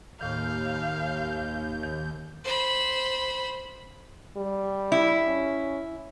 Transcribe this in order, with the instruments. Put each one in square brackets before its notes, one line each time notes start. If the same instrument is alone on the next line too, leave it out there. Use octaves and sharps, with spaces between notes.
[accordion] D#2 G6 [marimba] A2 D#3 [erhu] F5
[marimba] D#3
[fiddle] C5 B5
[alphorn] G3
[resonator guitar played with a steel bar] E4
[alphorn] C#4